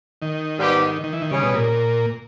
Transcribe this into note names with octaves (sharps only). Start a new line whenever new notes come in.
D#3
G#2 G3 B3 G4
D#3
E3
D#3
C#3 G3 C#4 G#4
B2
A#2